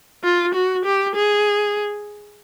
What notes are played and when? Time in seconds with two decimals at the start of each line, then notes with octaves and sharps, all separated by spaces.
0.24 F4
0.54 F#4
0.85 G4
1.15 G#4